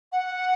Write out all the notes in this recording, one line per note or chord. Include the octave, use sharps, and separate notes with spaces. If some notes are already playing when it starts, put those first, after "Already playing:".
F#5